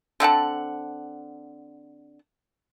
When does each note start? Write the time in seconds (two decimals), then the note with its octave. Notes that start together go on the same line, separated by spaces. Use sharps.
0.20 D3 C4 F#5 A5